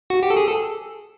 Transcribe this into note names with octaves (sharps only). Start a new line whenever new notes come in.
F#4
G4
A4
G#4
A4